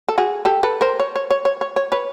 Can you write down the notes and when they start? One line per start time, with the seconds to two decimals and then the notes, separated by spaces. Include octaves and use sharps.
0.09 A4
0.18 F#4 G#4
0.45 G4 A4
0.63 A4 B4
0.81 A#4 C5
1.00 C#5
1.16 C#5
1.31 C#5
1.45 C#5
1.61 C#5
1.76 C#5
1.92 B4 C#5